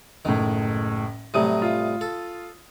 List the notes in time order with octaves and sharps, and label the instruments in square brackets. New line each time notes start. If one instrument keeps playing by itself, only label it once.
[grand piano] F#1 A2 [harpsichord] D#3
[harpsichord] A2 C3 G3 [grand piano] F#3 D#6 D#7
[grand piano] F4
[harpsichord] A4